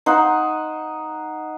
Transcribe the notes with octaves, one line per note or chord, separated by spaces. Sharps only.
D#4 C5 F#5